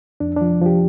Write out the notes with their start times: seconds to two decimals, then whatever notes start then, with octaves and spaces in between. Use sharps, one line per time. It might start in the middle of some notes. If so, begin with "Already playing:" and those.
0.20 F2 D4
0.37 F3 D4
0.61 F3 G4